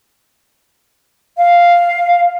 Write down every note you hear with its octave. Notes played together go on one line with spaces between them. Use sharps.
F5